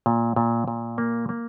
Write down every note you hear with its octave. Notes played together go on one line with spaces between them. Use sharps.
A#2
A#2
A#2
A#3
A#3